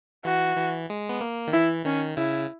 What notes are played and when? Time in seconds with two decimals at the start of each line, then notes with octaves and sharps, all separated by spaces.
0.25 E3 F#4
0.57 E3
0.90 G#3
1.09 B3
1.21 A#3
1.47 D#3
1.53 E3 E4
1.85 D#3 C#4
2.17 C#3 E4